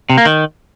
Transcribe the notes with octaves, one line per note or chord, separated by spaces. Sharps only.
C3
A#3
D#3